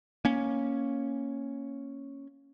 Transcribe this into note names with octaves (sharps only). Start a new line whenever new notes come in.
A#3 C#4